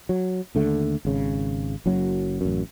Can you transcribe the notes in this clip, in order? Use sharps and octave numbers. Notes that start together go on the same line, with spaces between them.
F#3
D#2 D3 A3
G#1 C#3
F#1 F#2 F#3
A1 F#2